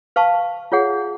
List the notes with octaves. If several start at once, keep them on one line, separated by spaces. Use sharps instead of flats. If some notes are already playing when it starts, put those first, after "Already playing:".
B4 F5 A5 C#6
F4 G#4 C#5 F#5